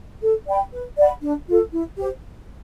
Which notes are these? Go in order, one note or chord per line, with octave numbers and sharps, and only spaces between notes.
A4
D5 G5 B5
B4
D5 F#5 B5
D4
F4 A4
E4
G4 C5